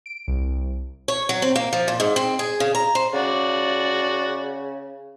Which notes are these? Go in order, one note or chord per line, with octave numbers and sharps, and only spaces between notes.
D7
C2
C#5
F#3
C4
A#3
F3
A#2
G#2
C4
G#4
C#3
A#5
C5
C#3 F#4 D5